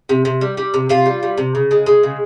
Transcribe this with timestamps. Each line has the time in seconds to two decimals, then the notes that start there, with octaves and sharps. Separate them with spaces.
0.09 C3
0.25 C3
0.41 G3
0.57 G3
0.74 C3
0.89 C3 F4
1.06 G3
1.23 G3
1.38 C3
1.55 C#3
1.71 G#3
1.86 G#3
2.03 C#3